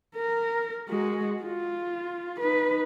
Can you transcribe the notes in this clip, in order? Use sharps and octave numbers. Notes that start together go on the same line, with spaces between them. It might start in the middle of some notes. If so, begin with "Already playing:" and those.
A#4
G#3 F#4
F4
D#4 B4